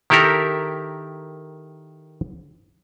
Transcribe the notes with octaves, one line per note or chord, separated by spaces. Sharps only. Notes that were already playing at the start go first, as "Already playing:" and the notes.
D#3 E4 G4 A4 A#4